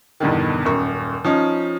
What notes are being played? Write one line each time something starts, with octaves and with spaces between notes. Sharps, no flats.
E2 G2 B2 D3 D#3
D#1 F#2 A#4 C#6
F3 C#4 D#4